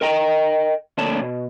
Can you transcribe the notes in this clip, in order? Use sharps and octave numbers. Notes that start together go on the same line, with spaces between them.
A#4 D#5 G5 A#5
D2 D3 A#3 C#5 D5 A5
B2